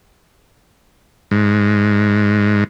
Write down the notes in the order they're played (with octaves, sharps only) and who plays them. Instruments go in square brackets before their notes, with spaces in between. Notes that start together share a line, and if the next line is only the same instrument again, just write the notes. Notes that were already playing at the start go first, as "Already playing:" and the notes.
[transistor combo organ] G#2